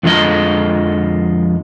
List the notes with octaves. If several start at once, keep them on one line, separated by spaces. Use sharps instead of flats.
F2 D3 F3 G#3 D#5